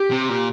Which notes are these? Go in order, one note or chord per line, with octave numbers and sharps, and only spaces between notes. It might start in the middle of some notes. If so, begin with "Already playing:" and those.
Already playing: G4
C3
A#2